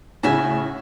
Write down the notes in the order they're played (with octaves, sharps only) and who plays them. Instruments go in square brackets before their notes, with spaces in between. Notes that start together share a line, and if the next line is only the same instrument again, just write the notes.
[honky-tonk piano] A2 C#3 [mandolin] F#4 E5 G#5